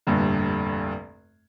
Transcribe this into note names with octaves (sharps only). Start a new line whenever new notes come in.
F1 A#1 G2 D3